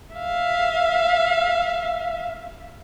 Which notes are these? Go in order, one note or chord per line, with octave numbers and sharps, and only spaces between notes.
E5 F5